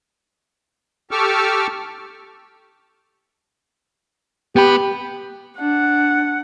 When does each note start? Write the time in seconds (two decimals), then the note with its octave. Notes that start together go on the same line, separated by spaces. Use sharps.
1.11 G4 A4 C#6 D6 E6 F6
4.56 B3 G4 B5
5.60 D4 F#5